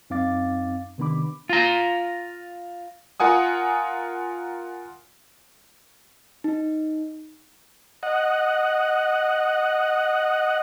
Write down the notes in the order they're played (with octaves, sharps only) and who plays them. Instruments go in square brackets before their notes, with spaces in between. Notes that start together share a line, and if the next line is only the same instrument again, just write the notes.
[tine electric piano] F#2 C4 D#4 F5 D6 A6
C3 D#3 B3 D4 B5 D6
[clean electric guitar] F4 A#5
[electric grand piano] F4 A#4 F#5 G#5 D#6
[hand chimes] D#4
[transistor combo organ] D#5 F#5